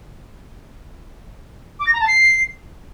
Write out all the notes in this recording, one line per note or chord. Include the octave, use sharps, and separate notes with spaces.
D6
A#6
A#5
A5
C7